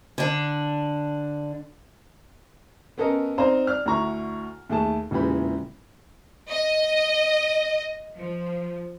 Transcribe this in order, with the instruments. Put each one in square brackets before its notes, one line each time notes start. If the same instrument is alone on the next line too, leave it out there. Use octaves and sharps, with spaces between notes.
[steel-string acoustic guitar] D3 D4
[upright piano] B3 C#4 A4 A#4 D#5
C4 D#4 C5 D5 F5 A#5
D5 F6
D2 D3 E4 A#5 C#6
D#2 A3 G#4 A5
E1 A#2 C#3 E3 G4 B5
[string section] D#5
F3